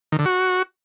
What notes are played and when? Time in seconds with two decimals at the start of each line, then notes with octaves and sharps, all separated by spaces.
0.12 D#3
0.19 D3
0.26 F#4